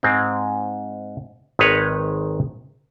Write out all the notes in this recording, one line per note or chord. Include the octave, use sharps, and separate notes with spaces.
G#2 G#3 C4
G#1 D#3 G#3 D#4 B4 C#5